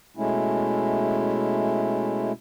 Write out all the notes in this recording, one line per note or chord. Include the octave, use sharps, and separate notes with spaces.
B2 G#3 A3 C#4 E4